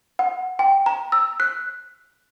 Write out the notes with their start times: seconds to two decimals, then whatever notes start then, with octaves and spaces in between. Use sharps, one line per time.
0.19 F#5
0.59 G5
0.86 A#5
1.12 E6
1.40 F#6